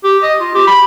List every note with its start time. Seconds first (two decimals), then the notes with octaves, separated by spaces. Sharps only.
0.04 G4
0.23 D#5
0.41 F4
0.55 G4
0.67 B5